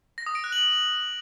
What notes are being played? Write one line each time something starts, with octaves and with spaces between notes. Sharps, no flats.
A#6
D#6
D7
F#6
F#7